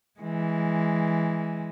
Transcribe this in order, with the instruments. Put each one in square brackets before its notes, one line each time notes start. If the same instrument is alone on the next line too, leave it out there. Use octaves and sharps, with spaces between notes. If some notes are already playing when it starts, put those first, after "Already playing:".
[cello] E3 G#3